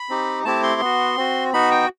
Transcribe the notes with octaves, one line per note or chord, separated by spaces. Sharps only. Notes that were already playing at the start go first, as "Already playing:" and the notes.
Already playing: B5
C4 D#4 G4
A3 C4 E4 G4 A5
C6
B3 F#4
C4 F#4
B3 D#4 F#4 B5
G5